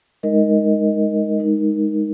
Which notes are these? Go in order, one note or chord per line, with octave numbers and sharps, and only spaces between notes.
G#3 D#4 A#4 D#5
G#3 D#4 A#4